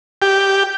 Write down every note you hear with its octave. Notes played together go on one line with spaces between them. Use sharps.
G4